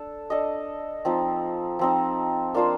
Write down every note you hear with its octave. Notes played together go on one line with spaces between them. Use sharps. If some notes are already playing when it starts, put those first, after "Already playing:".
Already playing: D4 A4
D4 A4 D#5
F3 C4 D#4
F3 C4 D#4
A#3 D4 F4 C5